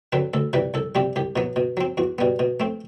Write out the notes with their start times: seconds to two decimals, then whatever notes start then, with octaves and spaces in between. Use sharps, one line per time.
0.12 D3 F#3 C4 B4
0.34 D2 A4
0.53 C3 E3 G3 B4
0.74 C2 A4
0.95 C3 G3 C4 G4
1.16 C2 G4
1.36 B2 F#3 B3
1.56 B2
1.77 F#3 C4
1.97 E2 F#4
2.19 B2 G3 B3
2.39 B2
2.60 A3 C4